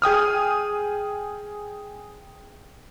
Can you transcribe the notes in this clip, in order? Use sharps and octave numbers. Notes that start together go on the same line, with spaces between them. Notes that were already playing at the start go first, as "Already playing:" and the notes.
G#4 G5 D#6 F6